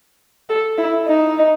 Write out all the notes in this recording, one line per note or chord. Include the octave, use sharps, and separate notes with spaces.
A4
E4
D#4